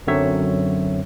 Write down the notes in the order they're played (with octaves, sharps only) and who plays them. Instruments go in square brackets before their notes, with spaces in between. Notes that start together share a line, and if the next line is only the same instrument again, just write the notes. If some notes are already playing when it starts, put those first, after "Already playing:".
[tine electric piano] F#2 D3 F#3 C4 C#5 E5